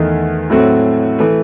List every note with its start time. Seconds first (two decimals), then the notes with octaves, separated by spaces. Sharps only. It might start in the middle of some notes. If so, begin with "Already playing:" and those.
Already playing: E2 D#3 A3
0.50 A2 F#3 A3 C4 F#4
1.18 E3 A3